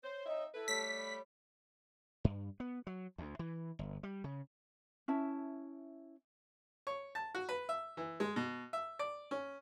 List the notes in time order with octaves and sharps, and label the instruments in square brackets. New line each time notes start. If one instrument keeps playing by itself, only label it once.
[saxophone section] C5 [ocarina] C#5
[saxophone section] C4 D#4 E5 [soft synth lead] D#5
[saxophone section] E4 B4 [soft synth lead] A4
[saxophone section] G3 A3 [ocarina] C#5 [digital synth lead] B6
[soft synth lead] B5
[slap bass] G2
B3
F#3
D2
E3
G1
G3
C#3
[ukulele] C#4 E4 E5 A5
[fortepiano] C#5
A5
F#4
B4
E5
E3
G#3
B2
E5
D5
C#4